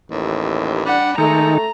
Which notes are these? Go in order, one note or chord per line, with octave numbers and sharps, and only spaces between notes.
A1 D#2
G3 D4 F#5
D#3 G#3 A3 D#4 A4 A#5